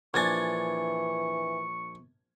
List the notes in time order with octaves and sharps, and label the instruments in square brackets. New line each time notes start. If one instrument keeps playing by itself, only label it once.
[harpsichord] A#1 D4 G#5 [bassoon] E3 [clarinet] C#6 [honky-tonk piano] G#6 A6